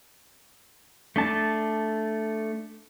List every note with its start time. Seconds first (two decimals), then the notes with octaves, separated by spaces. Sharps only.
1.16 A3 D4 A5